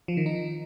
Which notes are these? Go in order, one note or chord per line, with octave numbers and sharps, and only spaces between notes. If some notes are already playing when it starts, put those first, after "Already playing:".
F3
D#3
D#4